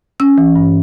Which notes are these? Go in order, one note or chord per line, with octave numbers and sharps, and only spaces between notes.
C#4 E6
E3
G2